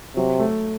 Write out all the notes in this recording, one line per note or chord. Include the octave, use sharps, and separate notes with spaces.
C3 F#3
A3